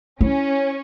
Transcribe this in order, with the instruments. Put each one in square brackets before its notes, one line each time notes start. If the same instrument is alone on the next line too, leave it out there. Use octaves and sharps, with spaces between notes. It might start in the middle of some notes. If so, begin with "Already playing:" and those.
[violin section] C#4 [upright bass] E4